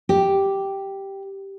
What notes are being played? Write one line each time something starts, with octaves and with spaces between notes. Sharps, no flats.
G4